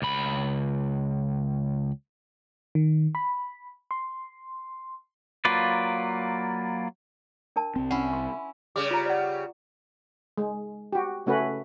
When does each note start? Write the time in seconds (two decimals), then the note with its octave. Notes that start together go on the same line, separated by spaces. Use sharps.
0.02 C#2 B5
2.75 D#3
3.15 B5
3.91 C6
5.45 F#3 A#3 F4 B4 D5
7.56 D4 A#4 A5
7.76 C2 C4
7.91 C#4 E4 F#5
8.13 C6
8.76 C#3 G3 D6
8.91 F4 A#5
9.06 D5 F#5
9.21 F#5
10.38 G#3
10.93 F#4 G4
11.26 C#3 A3 C#4 F#4 B4